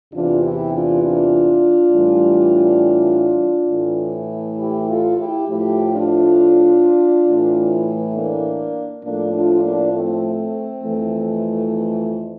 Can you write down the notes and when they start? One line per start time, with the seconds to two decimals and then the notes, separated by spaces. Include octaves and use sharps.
0.13 E2 C3 E3 D4 F4
0.43 E4 G4
0.73 D4 F4
1.03 D4 F4
1.91 A2 E3 G3
3.70 A2 E3 A3
4.59 E4 G4
4.88 F4 A4
5.18 E4 G4
5.48 A2 F3 A3 E4 G4
5.93 D4 F4
7.27 A2 E3 A3
8.15 A#3 D4
9.04 A2 F3 A3 A#3 D4
9.34 D4 F4
9.63 A#3 D4
9.93 A3 C4
10.82 F2 E3 A3